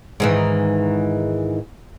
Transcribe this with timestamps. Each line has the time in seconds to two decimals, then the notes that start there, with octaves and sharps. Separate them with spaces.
0.20 G#2 D#3 E3